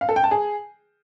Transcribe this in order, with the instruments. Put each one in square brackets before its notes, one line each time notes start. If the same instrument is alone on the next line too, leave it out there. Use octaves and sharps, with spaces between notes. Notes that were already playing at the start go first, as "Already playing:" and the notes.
[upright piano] F5
A4
G5
A5
G#4